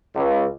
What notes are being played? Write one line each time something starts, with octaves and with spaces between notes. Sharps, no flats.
C#2